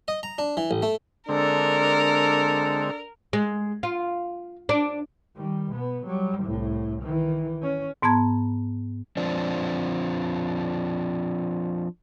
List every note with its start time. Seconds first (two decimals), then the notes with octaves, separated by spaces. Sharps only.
0.08 D#5
0.23 A#5
0.38 D4
0.57 E3
0.71 A1
0.82 A3
1.29 D3 G#3 C4 D4 A4 A#4
3.33 G#3
3.83 F4
4.69 D4
5.37 D#3 G3
5.72 B2 B3
6.06 F#3 G3
6.43 C2 A2
7.02 D#3 E3
7.62 C#4
8.02 G#2 B3 A5 A#5 G#6
9.17 F3 C4 D4